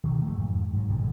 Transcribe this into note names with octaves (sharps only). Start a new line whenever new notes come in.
B2 D#3
F3 G#3 A3
F2 G#2
G#2 F#3
G#1 B2 D3 F3